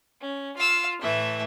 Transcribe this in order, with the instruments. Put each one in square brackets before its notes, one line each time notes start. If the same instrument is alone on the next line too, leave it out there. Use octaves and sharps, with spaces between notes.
[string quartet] C#4
[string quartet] F4 [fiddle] F5 E6
[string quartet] A2 E3 A3 [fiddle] E5